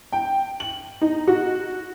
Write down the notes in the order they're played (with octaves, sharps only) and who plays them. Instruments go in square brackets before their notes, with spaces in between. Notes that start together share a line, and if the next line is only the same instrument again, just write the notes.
[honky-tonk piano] G5
F#7
D#4
F#4